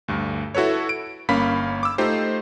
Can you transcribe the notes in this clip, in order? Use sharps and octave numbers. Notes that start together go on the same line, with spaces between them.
D2 G2
E4 F#4 A4 B4 C#5
D7
G1 A#3 C#4 F5 B5 B6
D6 E6
A3 D#4 F4 G4 C5